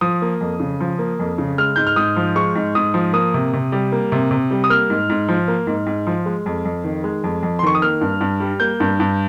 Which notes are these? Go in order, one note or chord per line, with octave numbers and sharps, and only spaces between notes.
F3 D#6
A#3
F2
C#3
F3
A#3
F2
C#3
G#3 F6
G#2 G6
F6
G#2 D#6
F3
G#3 C#6
G#2
G#2 D#6
F3
A#3 D#6
C3
C3
G3
A#3
C3
C3
G3
D#6
A#3 F6
G#2
G#2
F3
A#3
G#2
G#2
F3
G#3
F2
F2
D#3
G#3
F2
F2
C6
D#3 C#6
D#6
A#3 F6
G2
G2
G3
A#3 G6
G2
G2